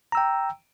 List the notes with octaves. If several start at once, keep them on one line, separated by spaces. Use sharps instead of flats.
G5 A#5 E6